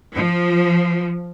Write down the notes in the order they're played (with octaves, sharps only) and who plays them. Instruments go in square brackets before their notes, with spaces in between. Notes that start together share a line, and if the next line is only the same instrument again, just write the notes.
[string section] F3